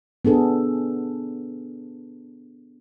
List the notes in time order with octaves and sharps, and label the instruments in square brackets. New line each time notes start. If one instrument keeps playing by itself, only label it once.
[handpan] B3 D4 G#4 A4